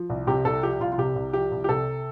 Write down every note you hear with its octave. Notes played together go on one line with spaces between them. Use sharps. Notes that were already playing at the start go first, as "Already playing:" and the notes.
Already playing: F3
C2
C3 G4
C2 A4
F3 G4
C2 F4
F4
C3 G4
C2
F3 G4
C2
G4
C3 A4